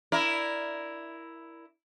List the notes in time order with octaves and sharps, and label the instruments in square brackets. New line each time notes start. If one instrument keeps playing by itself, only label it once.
[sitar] E4 A#4 D5